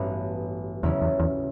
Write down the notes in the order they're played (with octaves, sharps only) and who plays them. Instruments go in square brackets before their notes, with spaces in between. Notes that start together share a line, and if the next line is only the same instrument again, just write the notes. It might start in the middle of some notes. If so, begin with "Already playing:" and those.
Already playing: [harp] A1 G2 F#3 B3
[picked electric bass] E2 [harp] C#3 F#3 C#4 E4
[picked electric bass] E2
E2